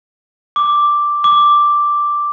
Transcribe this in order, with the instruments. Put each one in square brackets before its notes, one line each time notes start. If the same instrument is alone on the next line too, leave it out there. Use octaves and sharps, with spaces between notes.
[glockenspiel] D6
D6